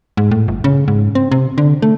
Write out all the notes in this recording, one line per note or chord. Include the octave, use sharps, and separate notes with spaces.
G#2
A2
G1
C#3
G#2
C4
C3
D3
A3